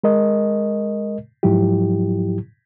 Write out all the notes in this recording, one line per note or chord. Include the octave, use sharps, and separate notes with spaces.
G#3 A#4 D#5
G#2 F3 F#3 E4 G4